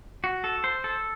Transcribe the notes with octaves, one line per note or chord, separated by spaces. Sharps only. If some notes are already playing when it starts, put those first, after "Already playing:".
F#4
A4
C5
A4